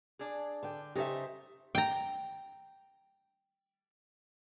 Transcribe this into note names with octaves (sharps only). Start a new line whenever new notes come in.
D4 G#4
D3 G5
C#3 D#4 G4 A4 C5 E5
G5 A#5